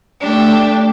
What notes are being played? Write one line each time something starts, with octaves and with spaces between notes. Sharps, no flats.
A3 D4 G4